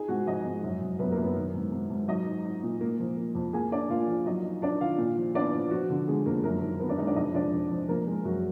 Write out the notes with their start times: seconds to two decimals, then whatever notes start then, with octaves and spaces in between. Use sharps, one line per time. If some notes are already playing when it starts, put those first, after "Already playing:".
Already playing: D#4 G#4 G#5
0.08 G#2 F#4 F#5
0.26 F3 D#4 D#5
0.45 G#2
0.64 F#2
0.81 F#2
0.99 F#2 B3 B4
1.11 A#3 A#4
1.18 F#2
1.23 B3 B4
1.36 D#3
1.55 G#2
1.72 G#2
1.90 G#2
2.08 F#3 D#4 D#5
2.26 D#4
2.45 D#4
2.63 A#2
2.81 A#3
3.00 F3
3.17 A#3
3.35 F2
3.53 A#3 G#4 G#5
3.71 A#3 D4 D5
3.90 A#3 F4 F5
4.07 F3
4.26 F#3 D#4 D#5
4.45 D#4
4.62 D4 D#4 D5
4.81 D#3 F4 F5
4.98 A#2
5.17 F3
5.34 B3 D4 D5
5.53 F3
5.71 F3 F#4
5.90 D3
6.08 D3 G#3 G#4
6.26 F2 A#3 A#4
6.44 F#2 A#3 A#4
6.62 D#3
6.80 D#3 B3 B4
6.89 D4 D5
6.98 G#3 D#4 D#5
7.07 D4 D5
7.16 F2 D#4 D#5
7.34 F2 D4 D5
7.53 F2
7.71 F3
7.88 F3 A#3 A#4
8.07 G#3
8.25 F#2 F#4